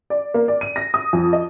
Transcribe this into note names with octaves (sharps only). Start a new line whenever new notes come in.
D5
A#3
D5
D#7
A#6
D#6
F2
D#5